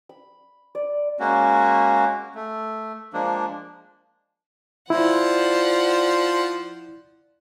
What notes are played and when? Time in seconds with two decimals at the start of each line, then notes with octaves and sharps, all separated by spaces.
0.09 B5
0.75 D5
1.19 G#3 A#3 C#4 F#4
2.35 A3
3.13 F3 G#3 A#3 D4
4.90 F3 E4 C5 D5 F#5